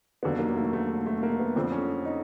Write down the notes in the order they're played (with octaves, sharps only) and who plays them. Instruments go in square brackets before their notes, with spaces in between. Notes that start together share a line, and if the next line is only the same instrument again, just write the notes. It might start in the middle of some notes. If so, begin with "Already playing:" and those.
[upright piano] F1 D#2 D3 F#3 B3
A#3
A3
A3
A3
A3
A#3
B3
F2 D3 F3 C4
C#4
D#4